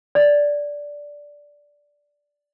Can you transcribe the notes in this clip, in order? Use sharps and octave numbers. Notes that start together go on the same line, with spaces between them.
D5